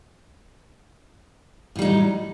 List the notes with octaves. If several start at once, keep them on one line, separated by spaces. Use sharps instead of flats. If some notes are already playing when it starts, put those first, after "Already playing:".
A2 F#3 G3 D#4